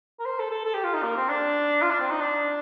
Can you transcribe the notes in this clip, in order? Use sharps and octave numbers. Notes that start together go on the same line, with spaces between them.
A#4
C5
A4
A4
A4
G4
F4
D#4
A#3
C4
D4
F4
D4
C4
D#4
D4